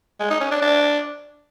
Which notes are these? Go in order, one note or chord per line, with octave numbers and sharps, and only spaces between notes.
G#3
D#4
C#4
D4
D4